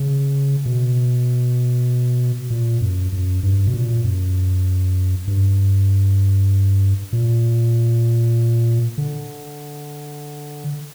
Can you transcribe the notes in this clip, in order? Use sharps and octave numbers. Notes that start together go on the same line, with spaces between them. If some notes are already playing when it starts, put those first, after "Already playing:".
Already playing: C#3
B2
A#2
F#2
F#2
G2
B2
A#2
F#2
G2
A#2
D3